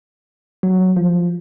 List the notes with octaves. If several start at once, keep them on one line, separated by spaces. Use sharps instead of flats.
F#3
F3